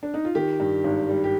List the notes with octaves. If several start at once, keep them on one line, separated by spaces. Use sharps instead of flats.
D4
D#4
F4
D#3 G4
G2
G#1
G3
G4